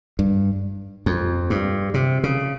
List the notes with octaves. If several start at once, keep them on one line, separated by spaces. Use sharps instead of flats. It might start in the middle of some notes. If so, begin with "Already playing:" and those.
G2
F2
G2
C3
C#3